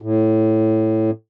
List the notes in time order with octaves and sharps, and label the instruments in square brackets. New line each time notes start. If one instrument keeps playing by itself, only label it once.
[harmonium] A2